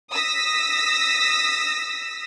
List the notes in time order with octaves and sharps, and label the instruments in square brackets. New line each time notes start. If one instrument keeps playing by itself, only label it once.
[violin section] D#6 E6 A#6 B6